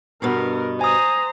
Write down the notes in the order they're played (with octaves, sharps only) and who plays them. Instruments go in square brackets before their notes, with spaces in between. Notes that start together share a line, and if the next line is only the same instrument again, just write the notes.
[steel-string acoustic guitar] G2 B2 B3 [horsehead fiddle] A#4
[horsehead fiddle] C5 A#5 [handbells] G#5 D#6